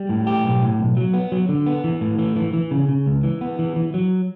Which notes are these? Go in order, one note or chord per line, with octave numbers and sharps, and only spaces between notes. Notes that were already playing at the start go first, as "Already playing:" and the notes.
Already playing: G3
A2
G4
B1
A2
B1
F#3
B3
F#3
D3
B3
E3
A2
E3
E3
E3
C#3
C#3
C#2
E3
B3
E3
E3
F#3